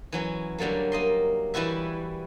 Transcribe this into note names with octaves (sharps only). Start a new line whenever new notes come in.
E3 F#3 C#4
D3 F#3 G3 A3 A#3
A#3 D#5 C6
E3 G3 E4 F#4 E5